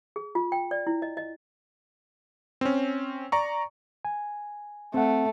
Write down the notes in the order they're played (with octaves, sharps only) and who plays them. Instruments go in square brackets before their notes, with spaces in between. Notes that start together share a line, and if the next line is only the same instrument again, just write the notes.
[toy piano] G#4
F4
G5
D5
E4
D#5
D#5
[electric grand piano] C4 C#4
D5 A#5 C#6
[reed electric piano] G#5
[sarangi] A3 [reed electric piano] C4 F#5